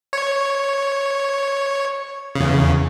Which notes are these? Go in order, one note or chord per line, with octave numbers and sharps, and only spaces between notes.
C#5
E2 C#3